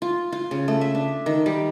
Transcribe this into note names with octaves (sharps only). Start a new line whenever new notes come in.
F4
F4
C#3
A3
E5
D4
D#3
G3